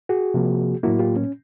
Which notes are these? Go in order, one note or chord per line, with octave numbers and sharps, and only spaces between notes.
F#4 G#4
C3 F3 A#3
A2 F#3 A#3 E4 F#4
F4 G4
C#4